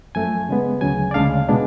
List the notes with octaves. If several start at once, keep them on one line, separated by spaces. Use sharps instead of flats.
F#2 F3 A3 G#5
C#3 G#3 B3
D2 C#3 F#3 G#5
D5
D2 C#3 G#3 D4 F5
B2 G#3 B3 D4